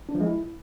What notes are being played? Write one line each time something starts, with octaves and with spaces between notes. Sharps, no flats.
D4
F3
G#3
E4